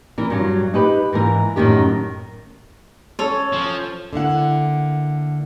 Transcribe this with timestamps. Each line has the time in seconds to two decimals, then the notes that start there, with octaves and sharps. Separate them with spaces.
0.18 E3 A#4
0.30 G2 F#3
0.74 D#4 G4 B4
1.13 G#2 E3 A#4
1.56 F#2 A2 D#3 G4
3.19 C#4 A4 C#5
3.53 F3
4.13 D3 A#3 E4 F#5